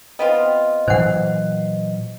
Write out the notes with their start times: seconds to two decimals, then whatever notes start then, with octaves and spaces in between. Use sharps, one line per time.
0.19 B3 C4 F4 D#5
0.88 A#2 E3 F#3 C5 F#5